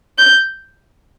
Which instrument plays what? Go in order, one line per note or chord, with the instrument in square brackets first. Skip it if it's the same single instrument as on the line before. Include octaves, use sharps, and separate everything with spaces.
[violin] G6